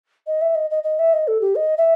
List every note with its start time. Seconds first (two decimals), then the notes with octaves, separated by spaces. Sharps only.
0.27 D#5
0.41 E5
0.55 D#5
0.71 D#5
0.84 D#5
0.99 E5
1.13 D#5
1.28 A4
1.41 G4
1.56 D#5
1.78 E5